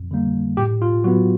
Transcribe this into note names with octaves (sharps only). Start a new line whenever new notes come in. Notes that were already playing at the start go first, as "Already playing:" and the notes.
Already playing: F2
D3 G3 A#3
A2 G4
F4
F#3 B3 F#4